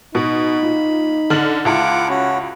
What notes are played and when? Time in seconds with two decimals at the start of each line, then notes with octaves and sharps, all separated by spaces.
0.15 B2 D#4 B5
0.62 A#2
1.30 D3 F6 F#7
1.65 C#2 E4 F4 F#5 A5 D6
2.09 C#4 F#4